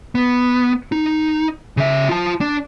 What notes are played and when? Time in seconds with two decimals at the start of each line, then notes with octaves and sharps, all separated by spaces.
0.15 B3
0.92 D#4
1.77 C#3 E5
2.09 F4 A5
2.41 D4